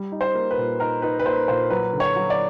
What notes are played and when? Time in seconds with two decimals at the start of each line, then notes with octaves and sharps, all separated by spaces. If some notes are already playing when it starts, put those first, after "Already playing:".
Already playing: G3
0.12 D#4
0.21 C5
0.35 A#3
0.51 B4
0.57 A#2
0.80 D#4 A#4
1.02 D#4 B4
1.20 B4
1.26 A#3 C5
1.48 A#2 C5
1.70 F#3 B4
1.93 D3
2.00 C#5
2.16 F#3
2.30 D5